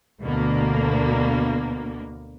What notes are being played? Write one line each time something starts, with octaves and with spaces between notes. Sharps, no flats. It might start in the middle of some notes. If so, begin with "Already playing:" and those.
D2 B2 D3 A#3